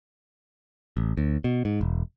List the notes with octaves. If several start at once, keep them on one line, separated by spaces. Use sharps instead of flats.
A1
D2
B2
G#2
E1